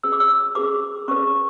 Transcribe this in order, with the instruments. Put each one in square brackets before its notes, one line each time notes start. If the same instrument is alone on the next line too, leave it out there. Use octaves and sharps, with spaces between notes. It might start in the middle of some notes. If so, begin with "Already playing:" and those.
[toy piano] C#4 G#4 B4 E6
D6
E6
C#4 G#4 B4 D6
C#4 G#4 B4 C#6